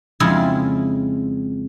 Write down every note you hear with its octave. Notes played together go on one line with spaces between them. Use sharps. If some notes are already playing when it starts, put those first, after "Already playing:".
F2 C#3 G#3 E4 F4 G#4